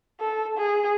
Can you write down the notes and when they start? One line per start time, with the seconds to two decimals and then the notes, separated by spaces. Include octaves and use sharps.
0.21 A4
0.58 G#4